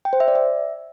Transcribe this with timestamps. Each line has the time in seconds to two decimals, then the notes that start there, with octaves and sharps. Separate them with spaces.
0.05 G5
0.13 C5
0.20 E5
0.28 D5
0.35 E5